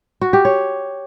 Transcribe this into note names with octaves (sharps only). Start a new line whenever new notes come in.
F#4
G4
C#5